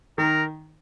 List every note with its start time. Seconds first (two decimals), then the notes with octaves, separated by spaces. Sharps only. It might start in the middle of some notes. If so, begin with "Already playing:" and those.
0.18 D#3 A#4